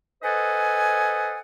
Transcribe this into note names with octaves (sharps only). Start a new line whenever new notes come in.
A4 B4 C5 D#5 F#5 G#5